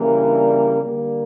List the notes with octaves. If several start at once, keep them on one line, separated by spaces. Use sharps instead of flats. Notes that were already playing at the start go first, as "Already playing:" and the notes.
Already playing: C#3 E3 G3 A#3
D4
D3 G3 A#3